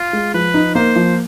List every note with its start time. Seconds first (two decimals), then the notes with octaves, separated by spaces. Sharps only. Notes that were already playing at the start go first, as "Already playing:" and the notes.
Already playing: F4
0.13 G#3
0.34 F3 B4
0.54 D#4
0.75 A#3 C5
0.96 F3